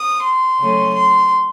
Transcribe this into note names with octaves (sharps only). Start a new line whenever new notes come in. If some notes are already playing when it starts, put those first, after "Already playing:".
Already playing: D#6
C6
C#3 F#3 A3 C#4
C6